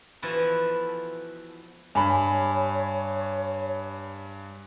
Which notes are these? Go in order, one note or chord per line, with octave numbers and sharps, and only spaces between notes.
E3 F3 B3 E4 F#4 A4
G2 C#5 G#5 B5